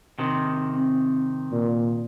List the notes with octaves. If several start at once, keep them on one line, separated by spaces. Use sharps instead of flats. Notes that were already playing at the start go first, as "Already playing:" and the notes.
C3 D#3
C4
A#2